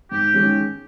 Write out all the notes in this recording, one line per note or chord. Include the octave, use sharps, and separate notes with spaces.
G#2 G4
D#3 G#3 C#4